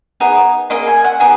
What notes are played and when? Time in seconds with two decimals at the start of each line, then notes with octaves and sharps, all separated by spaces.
0.20 B3 D#4 G#4
0.70 A#3 F4 G#4 D#5
0.87 G#5
1.04 F#5
1.20 B3 D#4 G#4